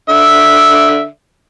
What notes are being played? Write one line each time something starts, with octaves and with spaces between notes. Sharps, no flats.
D3 E5